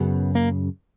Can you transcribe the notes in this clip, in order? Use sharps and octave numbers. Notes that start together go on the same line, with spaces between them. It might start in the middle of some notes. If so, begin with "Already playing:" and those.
Already playing: F#2 C#3 B3
A#3